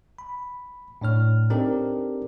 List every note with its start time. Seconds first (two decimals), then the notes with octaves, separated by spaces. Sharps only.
0.18 B5
1.01 A2 D4 C#5 F6
1.50 C4 D4 D#4 G4 A4 A#4